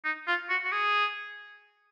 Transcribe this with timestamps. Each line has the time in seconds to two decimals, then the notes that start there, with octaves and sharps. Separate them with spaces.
0.05 D#4
0.27 F4
0.50 F#4
0.65 F#4
0.72 G#4